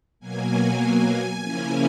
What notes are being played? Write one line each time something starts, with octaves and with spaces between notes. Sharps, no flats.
B2 F#3 A#3 G#5
C#3 F3 A#3 C#4 E4